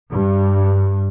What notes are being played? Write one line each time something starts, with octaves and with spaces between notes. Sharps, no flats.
G2